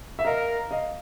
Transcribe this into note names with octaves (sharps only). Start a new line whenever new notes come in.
E5
A#4 D#5 F5
D#5 F5